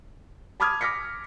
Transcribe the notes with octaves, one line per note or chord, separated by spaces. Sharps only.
A5 B5 D6 D#6 F6 G#6
D6 F6 A#6 B6 C#7